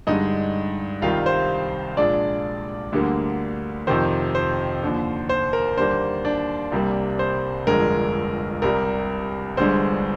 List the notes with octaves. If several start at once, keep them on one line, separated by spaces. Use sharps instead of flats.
G2 D3 G#3 D#4 D#5
C2 C3 D#3 G3 F4 F5
C5
A#1 A#2 G#3 D4 D5
D2 D3 G3 A#3
F2 C3 D#3 C5
C5
D#2 D3 F3
C5
A#4
D#2 D3 G3 A#3 C5
D4 D5
C2 C3 G3 A#3
C5
G1 F2 D3 G#3 A#4
C2 C3 G3 A#4
G1 G2 D3 G#3 C5